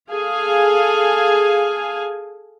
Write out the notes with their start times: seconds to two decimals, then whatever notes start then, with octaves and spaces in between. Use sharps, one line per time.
0.11 G#4 A4 F5 G#5